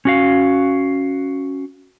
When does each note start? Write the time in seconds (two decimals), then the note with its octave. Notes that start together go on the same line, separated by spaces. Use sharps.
0.05 C#4 F#4 F5